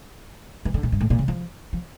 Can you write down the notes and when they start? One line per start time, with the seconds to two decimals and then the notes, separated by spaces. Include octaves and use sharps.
0.65 E3
0.74 D3
0.83 A#2
0.92 G2
1.01 A2
1.10 A#2
1.19 C#3
1.28 F3
1.73 F3